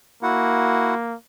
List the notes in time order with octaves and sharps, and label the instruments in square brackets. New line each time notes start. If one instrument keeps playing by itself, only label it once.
[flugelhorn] A#3 [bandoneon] E4 F#4 F#5